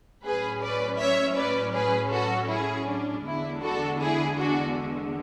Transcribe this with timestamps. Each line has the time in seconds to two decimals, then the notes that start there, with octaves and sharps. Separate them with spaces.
0.24 A2 F#3 C#4 G#4 B4
0.62 B4 D5
1.00 C#5 E5
1.37 B4 D5
1.74 G#4 B4
2.12 F#4 A4
2.49 E4 G#4
2.87 D4
3.24 E2 D3 G#3 D4 E4
3.62 F#4 A4
3.99 E4 G#4
4.37 D4 F#4